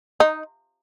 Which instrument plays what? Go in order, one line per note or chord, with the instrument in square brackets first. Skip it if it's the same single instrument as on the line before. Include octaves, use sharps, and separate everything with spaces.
[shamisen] D#4